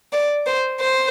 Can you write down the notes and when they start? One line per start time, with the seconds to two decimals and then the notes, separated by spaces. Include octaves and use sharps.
0.13 D5
0.47 C5
0.80 C5